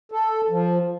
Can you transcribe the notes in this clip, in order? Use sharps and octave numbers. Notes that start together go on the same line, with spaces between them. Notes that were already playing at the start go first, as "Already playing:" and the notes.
A4
F3